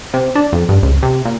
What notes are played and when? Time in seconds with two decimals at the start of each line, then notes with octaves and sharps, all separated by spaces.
0.14 C3
0.35 D4
0.52 F2
0.69 G2
0.83 C#2
1.03 C3
1.25 A#2